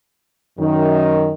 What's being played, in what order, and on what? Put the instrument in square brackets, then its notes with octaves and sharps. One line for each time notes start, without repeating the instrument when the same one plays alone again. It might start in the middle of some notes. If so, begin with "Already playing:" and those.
[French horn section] F#2 D#3